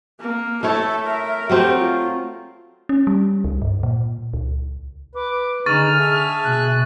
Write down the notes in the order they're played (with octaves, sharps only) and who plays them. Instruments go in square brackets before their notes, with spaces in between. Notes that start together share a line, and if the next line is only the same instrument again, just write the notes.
[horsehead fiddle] A#3
[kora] A3 E4 C#5 [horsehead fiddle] A4 [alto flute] E5
[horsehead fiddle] A#4
[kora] F#3 A3 C4 [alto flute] G4
[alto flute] F4
[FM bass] C#4
G3
C#2
G2
A#2
C#2
[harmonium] B4 [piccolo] D6
[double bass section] D3 [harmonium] D#4 G#4 [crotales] C#6 A6 D#7 [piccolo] F6
[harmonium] G#4 E5 A5
[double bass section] B2 [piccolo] F#6